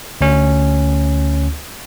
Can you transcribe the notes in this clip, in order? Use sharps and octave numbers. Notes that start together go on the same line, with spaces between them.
D2 C#4